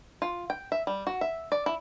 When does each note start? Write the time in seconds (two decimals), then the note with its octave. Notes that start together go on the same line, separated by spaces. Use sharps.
0.22 F4
0.50 G5
0.72 E5
0.87 G3
1.07 F#4
1.21 E5
1.52 D5
1.66 E4